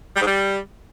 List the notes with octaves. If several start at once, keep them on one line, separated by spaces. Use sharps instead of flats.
G3
G#2
G3